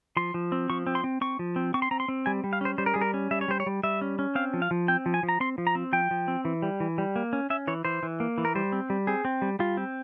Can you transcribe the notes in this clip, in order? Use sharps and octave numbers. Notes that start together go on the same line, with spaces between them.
F3 C6
F3
C4
F3 C#6
C4
C6
C4
C4 C#6
F3
C4
C4 C#6
C6
C4 A#5
C6
C4
G3 G#5
G3
F5
C#4 C5
G3 C5
A#4
G3 G#4
A#4
C#4
G3 E5
C#5
G3 C5
C#5
G3
G3 E5
C#4
C#4
C4 F5
F3
F5
F3
C4 G5
F3
G#5
F3
A#5
C4 C6
F3
A#5
C4
F3 G5
F3
C4
E3
G3
E3
G3
A#3
C#4
C#4 E5
E3 C#5
E3 C5
E3
A#3
E3
A#4
G3 C5
C4
G3
C4 G#4
C4
G3
G3 F4
C4